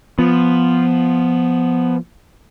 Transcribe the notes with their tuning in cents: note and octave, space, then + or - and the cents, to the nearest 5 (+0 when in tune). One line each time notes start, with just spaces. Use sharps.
F3 -5 B3 +0